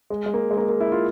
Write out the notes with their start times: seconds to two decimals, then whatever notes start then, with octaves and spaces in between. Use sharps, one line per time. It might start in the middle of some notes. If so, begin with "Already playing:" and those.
0.10 G#3
0.26 G#3
0.34 A#3
0.51 G#3
0.57 A#3
0.69 A#3
0.80 E4
0.92 F4